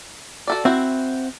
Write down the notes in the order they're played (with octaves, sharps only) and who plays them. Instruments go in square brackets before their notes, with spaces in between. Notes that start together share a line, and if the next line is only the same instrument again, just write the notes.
[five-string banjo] F#4 A4 D5
[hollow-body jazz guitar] C4 [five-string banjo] E4 F#4